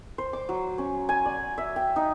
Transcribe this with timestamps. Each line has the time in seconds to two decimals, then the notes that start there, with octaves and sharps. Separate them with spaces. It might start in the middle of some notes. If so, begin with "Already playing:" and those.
0.18 C5
0.33 D6
0.49 F#3
0.78 C#4
1.09 G#5
1.25 D5
1.58 E5
1.76 G5
1.96 D#4